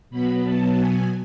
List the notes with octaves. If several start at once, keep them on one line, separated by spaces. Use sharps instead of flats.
B2 F#3 B3 B5
A5
G#5